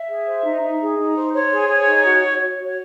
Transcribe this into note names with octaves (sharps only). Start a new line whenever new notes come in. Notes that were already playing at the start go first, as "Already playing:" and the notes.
Already playing: E5
G#4
C5
D#4
D#4
G#4
D#4
C5
C5 C#5
G#4
G#4
D#4
F#4
F#4
C#5
F#4 C#5